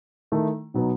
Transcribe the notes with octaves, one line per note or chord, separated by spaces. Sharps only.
D#3 A3 E4
B2 F#3 B3 D#4